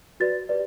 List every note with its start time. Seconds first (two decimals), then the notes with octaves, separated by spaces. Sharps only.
0.20 F#4 B4 D5 A6
0.49 G4 B4 D5